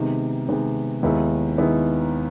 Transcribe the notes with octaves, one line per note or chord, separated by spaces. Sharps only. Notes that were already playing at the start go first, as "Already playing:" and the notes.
Already playing: C3 D#3 G#3 B3
C3 D#3 G#3 B3
D#2 D#3 G#3 B3 E4
D#3 G#3 B3 E4